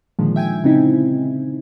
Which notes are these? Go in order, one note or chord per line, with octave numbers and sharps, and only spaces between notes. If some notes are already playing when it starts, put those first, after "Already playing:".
A#2 D3 D#3 F3 G#3
E5 G5 G#5 G#6
C#3 C4 D#4 E4